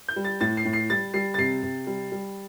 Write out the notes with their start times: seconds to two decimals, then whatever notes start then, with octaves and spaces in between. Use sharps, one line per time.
0.08 G6
0.16 G3
0.25 A6
0.41 A2 A6
0.57 C7
0.65 A2
0.73 C7
0.90 G3 A6
1.14 G3 C7
1.34 A6
1.38 C3 C7
1.63 C3
1.87 G3
2.12 G3